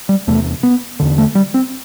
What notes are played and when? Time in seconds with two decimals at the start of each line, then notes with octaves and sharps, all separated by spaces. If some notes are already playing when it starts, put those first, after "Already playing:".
0.09 G3
0.27 E2 C3 A3
0.63 B3
1.00 E2 D3
1.18 A3
1.35 G3
1.54 C4